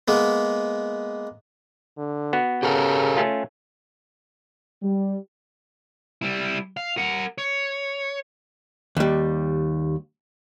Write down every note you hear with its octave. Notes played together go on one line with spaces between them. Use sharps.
G#3 A#3 B3
D3
B3 F#4
C#3 G4 A4 A#4
A3 C#4 F4
G3
G3 E4
F5
A#4 F#5
C#5
D#2 G3